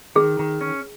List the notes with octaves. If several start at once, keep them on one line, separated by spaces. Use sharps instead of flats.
D#3 G#4
D#3
C#4